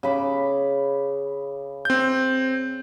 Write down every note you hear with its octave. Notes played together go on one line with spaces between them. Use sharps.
C#3 B5 D6
C4 G6